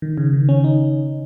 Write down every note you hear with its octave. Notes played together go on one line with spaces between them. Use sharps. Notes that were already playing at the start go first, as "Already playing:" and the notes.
D#3
C#3
D#3
C#4
D#4